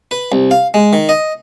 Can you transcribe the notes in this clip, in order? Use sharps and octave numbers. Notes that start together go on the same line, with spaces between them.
B4
C2
F5
G#3
D#3
D#5